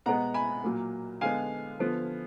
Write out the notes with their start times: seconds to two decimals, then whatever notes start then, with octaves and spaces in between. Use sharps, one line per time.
0.06 B2 G#3 B3 F#5 A#5
0.34 G#5 B5
0.64 A#2 F#3 A#3
1.21 D3 G#3 B3 F5 G#5
1.79 D3 F3 B3